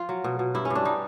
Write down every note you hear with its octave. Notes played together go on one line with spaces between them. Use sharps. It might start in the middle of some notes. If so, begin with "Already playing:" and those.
Already playing: F3 F4
F#3
B2
B2
G2 E4
C#4
G2
D4
G3 D#4